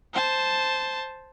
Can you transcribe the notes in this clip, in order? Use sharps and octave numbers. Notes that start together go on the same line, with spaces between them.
C5 A5